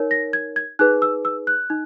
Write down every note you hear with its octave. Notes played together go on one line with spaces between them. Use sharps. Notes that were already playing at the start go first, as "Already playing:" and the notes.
Already playing: D#4 A#4 C#5
A#6
G#6
G#6
D#4 G#4 B4 F#6
E6
E6
F#6
D#4